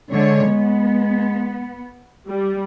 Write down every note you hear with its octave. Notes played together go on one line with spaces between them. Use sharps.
D3 G#3 C#5
B3
G3